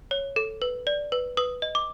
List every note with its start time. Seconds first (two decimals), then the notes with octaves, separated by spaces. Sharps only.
0.11 C#5
0.36 A4
0.62 B4
0.87 D5
1.12 B4
1.37 B4 D#6
1.62 D#5
1.75 D6